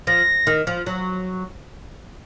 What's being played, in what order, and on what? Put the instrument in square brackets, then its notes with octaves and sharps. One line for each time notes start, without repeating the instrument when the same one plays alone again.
[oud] F3 [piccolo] A#6
[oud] D#3
F3
F#3